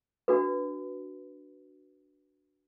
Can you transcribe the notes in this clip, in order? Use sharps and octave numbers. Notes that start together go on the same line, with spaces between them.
D4 F#4 B4